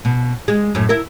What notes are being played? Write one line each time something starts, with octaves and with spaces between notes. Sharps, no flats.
B2
G#3
F#2 A2
E4 A#4